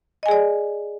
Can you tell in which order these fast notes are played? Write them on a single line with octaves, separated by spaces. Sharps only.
D#5 G#5 G#4 D5